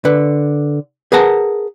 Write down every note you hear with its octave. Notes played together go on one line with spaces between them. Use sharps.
D3 B4
G#4 A#4 B4 F#5 A5 A#5